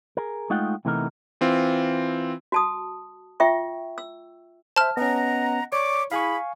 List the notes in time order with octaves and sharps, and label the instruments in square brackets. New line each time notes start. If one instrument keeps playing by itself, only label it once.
[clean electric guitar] G#4 A#4
G#3 A3 D#4 F4 F#5 G5
C3 E3 A3 B3 D#4 A#4
[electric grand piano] E3 C4 F4
[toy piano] F#4 A5 D#6
F4 E5 G5 C#6
E6
[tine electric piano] C5 E5 [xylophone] A5 F6
[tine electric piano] B3 C#4 [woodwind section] D#5 F#5 A#5
[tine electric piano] C#5 [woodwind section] D5 C#6 D6
[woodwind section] E4 G#4 B5 [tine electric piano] F5 G#5 C#6